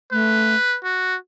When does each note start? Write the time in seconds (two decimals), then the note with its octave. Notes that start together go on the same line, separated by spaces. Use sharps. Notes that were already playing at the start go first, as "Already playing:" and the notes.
0.12 A3 B4
0.84 F#4